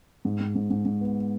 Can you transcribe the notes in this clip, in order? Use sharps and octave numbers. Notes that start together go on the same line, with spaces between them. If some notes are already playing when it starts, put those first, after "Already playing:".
G#2
G#2
G#2
G#2
G#2
B3